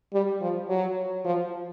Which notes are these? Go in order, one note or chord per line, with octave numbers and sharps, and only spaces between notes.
G3
F3
F#3
F3